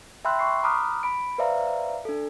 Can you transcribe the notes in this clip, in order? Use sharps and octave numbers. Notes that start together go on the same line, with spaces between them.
E5 G5 B5 C6 E6 F#6
C6 C#6 C7
A#5 B5 D6 D#6 F6 F#6
B5 D7
B4 C5 D5 E5 F5 A#5
D4 A4